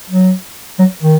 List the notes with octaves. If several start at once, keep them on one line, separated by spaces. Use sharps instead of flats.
F#3
F#3
D#3